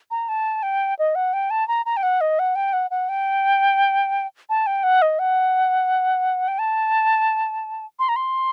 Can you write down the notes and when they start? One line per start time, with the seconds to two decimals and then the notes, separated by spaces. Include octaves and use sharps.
0.11 A#5
0.29 A5
0.63 G5
0.99 D#5
1.15 F#5
1.33 G5
1.50 A5
1.68 A#5
1.86 A#5
1.97 G5
2.03 F#5
2.21 D#5
2.39 F#5
2.55 G5
2.73 F#5
2.91 F#5
3.09 G5
4.49 A5
4.67 G5
4.83 F#5
5.02 D#5
5.19 F#5
6.48 G5
6.59 A5
7.99 C6
8.09 A#5
8.16 C6